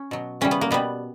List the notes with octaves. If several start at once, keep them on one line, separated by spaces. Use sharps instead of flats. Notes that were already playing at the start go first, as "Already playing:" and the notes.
Already playing: C#4
B2 F#3
C#3 E3 G3 C#4
B3
A#3
B2 G3 B3